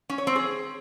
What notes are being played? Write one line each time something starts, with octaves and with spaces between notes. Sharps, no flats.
C#4
C#5
C4
G#4